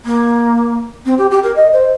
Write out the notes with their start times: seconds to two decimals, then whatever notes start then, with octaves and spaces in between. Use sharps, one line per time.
0.05 A#3
1.05 C4
1.18 G4
1.31 G4
1.43 A#4
1.56 D#5
1.72 C5